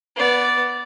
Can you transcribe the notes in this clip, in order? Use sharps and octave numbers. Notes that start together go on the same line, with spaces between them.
B3 D5